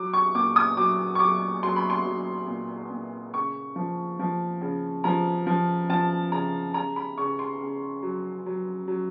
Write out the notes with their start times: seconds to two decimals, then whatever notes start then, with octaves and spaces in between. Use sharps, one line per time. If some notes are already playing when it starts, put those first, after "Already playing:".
Already playing: F#3 D6
0.13 C#6
0.35 A#2 D6
0.56 D#6
0.77 F#3 D6
1.15 C#6
1.20 F#3 D6
1.63 F#3 C6
1.76 B5
1.90 C6
2.05 F#3
2.47 A#2
2.90 A#2
3.33 C#3 C#6
3.76 F3
4.19 F3
4.61 C#3
5.04 F3 A#5
5.47 F3
5.90 F3 A5
6.32 C#3 A#5
6.74 C#3 A#5
6.96 B5
7.18 C#3 C#6
7.39 C6
7.60 C#3
8.03 F#3
8.46 F#3
8.88 F#3